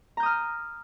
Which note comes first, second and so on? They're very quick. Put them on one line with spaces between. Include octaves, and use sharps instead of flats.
A#5 G6 D#6 F6